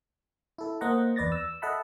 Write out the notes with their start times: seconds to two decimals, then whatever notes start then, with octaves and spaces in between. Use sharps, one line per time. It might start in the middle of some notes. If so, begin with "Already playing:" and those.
0.58 E4 A4
0.81 A#3 C5 D#5 F#5 A#5
1.16 E2 B4 D5 A6 A#6
1.32 E6
1.62 A4 D#5 E5 F#5 A5 B5